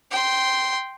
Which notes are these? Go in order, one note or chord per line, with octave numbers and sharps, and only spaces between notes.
G5 C6